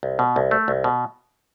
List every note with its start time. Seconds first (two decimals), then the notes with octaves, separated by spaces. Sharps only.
0.03 C2
0.19 B2
0.36 C2
0.51 A3
0.68 C2
0.84 B2